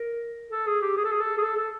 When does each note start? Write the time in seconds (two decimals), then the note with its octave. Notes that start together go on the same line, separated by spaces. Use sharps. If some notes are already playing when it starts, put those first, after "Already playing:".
Already playing: A#4
0.51 A4
0.67 G#4
0.81 G4
0.97 G#4
1.04 A4
1.11 G#4
1.20 A4
1.37 G#4
1.43 A4
1.57 A4